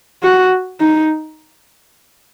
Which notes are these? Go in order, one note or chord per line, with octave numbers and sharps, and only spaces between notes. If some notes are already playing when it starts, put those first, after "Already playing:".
F#4
D#4